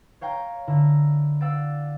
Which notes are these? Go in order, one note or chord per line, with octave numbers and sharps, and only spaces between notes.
C#5 F5 G5 A#5
D3 E4 A#4
D5 F5 F#5 E6 A6 D7